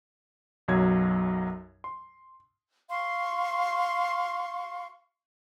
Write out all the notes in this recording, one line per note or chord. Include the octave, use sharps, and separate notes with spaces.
B1 F#2 F#3 G#6
C6
F5 C6 C#6